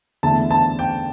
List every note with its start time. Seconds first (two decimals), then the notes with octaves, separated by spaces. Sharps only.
0.23 E2 D3 A3 E4 A5
0.51 A5
0.79 G5